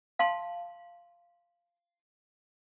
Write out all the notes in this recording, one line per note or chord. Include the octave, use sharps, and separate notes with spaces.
F5 A5 C6